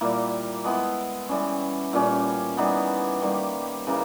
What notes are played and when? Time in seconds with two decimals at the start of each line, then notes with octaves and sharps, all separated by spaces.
0.01 A#2 G3 A#3 E4
0.64 G#3 B3 E4
1.29 E3 G3 C#4
1.93 A#2 G3 C#4 G4
2.57 E3 G3 B3 D#4
3.22 D#3 G3 A#3
3.87 C#3 E3 A#3